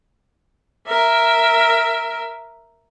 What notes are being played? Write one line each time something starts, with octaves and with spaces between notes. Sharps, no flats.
A#4 E5